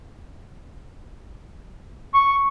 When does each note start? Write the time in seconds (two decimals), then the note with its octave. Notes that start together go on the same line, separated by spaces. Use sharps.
2.14 C#6